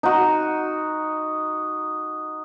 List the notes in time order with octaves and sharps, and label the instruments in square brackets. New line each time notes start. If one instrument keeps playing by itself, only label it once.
[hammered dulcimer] D#4 F#4